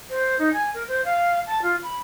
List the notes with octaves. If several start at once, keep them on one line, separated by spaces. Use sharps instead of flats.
C5
D#4
G#5
A#4
C5
F5
A5
F4
B5